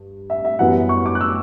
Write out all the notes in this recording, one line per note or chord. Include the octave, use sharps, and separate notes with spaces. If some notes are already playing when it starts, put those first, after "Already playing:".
Already playing: G2
E5
E5
F#2 E3 G3 B3 F#5
C#6
D6
F#6
E6